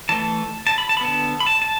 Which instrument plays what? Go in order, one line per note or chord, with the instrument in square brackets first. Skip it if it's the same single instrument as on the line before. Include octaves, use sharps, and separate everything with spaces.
[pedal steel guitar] E3 A3 A5
A5
B5
A5
B5
D3 B3 A5
B5
A5
A5